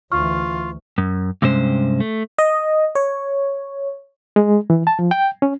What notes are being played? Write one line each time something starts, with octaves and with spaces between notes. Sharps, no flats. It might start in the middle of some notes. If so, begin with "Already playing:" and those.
D2 E3 F4 C#6 F6
F#2
G2 C3 G#3 C#4 C5
A3
D#5
C#5
G#3
E3
A5
F3
G5
C#4